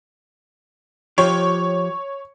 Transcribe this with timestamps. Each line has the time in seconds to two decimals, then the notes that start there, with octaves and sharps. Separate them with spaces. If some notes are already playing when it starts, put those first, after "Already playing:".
1.18 F3 G4 C#5